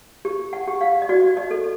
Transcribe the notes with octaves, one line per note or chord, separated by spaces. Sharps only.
G4
F#5
G4
F5
D#5
F#4 D5
D#5
A4